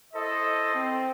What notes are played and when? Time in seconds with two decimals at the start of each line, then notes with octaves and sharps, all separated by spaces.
0.14 E4 A4 C5 D#5
0.73 C4